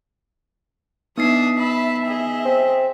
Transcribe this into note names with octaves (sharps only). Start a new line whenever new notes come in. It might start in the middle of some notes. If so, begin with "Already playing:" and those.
B3 D4 D#4 E5 D#6 C7
E5 A5 B5
G#4 D#5
C4